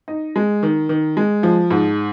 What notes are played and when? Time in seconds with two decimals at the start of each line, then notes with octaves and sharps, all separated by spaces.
0.08 D#4
0.36 G#3
0.63 D#3
0.89 D#3
1.17 G#3
1.43 F3
1.71 G#2